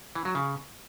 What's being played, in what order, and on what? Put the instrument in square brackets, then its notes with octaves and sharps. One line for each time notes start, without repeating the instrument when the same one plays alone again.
[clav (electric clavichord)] E3
F#3
C#3